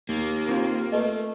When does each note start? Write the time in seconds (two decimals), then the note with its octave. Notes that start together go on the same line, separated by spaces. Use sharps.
0.09 D#2 A#3
0.49 C4 F4 A#4
0.92 A3 A4 B4 D#5